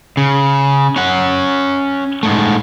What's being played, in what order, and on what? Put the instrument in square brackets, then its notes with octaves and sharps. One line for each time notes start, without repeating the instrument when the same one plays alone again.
[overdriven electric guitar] C#3
C#4 F#5
G#2 A3